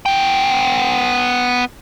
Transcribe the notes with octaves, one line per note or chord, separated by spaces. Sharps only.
B3 G5